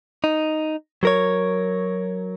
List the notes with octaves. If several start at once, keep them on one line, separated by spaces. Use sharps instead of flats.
D#4
F#3 A#4 C#5